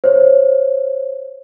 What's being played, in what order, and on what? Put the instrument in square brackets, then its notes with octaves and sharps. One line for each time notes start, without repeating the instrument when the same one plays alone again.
[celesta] C5 C#5